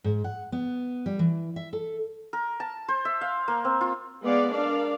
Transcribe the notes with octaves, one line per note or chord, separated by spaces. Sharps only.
G#2
F#5
B3
G3
E3
E5
A4
A#4
A5
C5
E5
F5
A#3
C4
F4
G#3 B3 G#4 D5 F5
D4 A#4 D5 F5